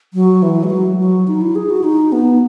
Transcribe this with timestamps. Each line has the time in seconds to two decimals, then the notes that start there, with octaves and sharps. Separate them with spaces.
0.14 F#3
0.43 E3
0.64 G#3
0.70 F#3
0.99 F#3
1.28 D#4
1.41 E4
1.55 G#4
1.70 F#4
1.84 D#4
2.12 B3